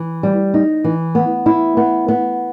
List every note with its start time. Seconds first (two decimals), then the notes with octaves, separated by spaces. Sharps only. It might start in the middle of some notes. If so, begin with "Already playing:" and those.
Already playing: E3
0.23 G3
0.54 D#4
0.84 E3
1.15 B3
1.46 E4
1.77 B3
2.08 B3